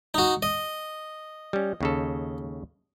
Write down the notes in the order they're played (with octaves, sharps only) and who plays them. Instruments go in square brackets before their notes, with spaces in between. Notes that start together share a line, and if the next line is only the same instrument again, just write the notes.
[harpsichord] D#4 F#4
D#5
[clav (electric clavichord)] G3 C#4
D#2 C#3 A4